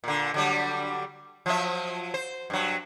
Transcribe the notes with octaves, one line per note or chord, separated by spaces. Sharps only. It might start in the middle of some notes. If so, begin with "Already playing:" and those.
A#2 D3
D3 F#3 G3
F3 F#3 E5
C5
G2 F#3